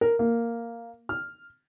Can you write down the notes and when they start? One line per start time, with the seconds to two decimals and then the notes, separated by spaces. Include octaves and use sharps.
0.01 A#4
0.19 A#3
1.09 F6